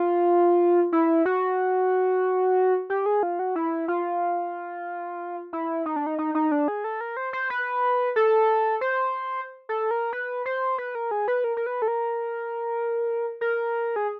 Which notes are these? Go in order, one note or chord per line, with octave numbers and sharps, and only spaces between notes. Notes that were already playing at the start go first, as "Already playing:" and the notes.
Already playing: F4
E4
F#4
G4
G#4
F4
F#4
E4
F4
E4
D#4
D4
D#4
D#4
D#4
D4
G#4
A4
A#4
C5
C5
B4
A4
C5
A4
A#4
B4
C5
B4
A#4
G#4
B4
A#4
A#4
B4
A4
A#4
A#4
G#4